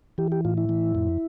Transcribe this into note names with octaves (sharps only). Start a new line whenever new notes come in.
E3 G4
G4
A2 F4
E4
E3
F2